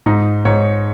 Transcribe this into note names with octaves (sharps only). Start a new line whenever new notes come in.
G#2 D#4
G#2 C#5